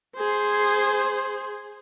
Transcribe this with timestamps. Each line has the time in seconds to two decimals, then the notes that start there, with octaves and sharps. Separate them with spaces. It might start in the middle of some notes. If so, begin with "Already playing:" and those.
0.17 G#4 C5